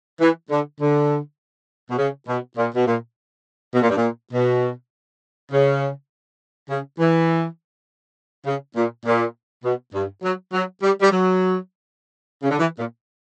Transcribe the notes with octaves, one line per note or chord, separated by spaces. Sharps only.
E3
D3
D3
B2
C#3
B2
A#2
B2
A#2
B2
A#2
G2
A#2
B2
C#3
C#3
E3
C#3
A#2
A#2
B2
G2
F#3
F#3
G3
G3
F#3
C#3
D3
E3
A#2